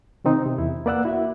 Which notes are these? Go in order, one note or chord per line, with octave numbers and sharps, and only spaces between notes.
C3 D#3 C4 D#4
C3
E2 E4
A#3 B4 D5 F#5 E6 F#6
E4 F#4 E5